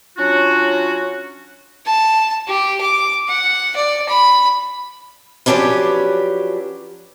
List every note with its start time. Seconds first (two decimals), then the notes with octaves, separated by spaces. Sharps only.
0.18 F#3 C#4 D4 F4 F#4
1.86 A5
2.48 G4
2.81 D6
3.28 F#5
3.76 D5
4.09 B5
5.46 F3 F#3 C#4 D4 G4 B4